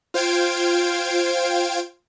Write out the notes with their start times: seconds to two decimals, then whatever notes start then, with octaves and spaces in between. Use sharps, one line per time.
0.14 F4 C5 F5 G5 G#6 D7